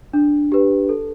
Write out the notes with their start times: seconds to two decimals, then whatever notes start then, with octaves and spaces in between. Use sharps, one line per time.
0.13 D4
0.52 G4 B4
0.89 A4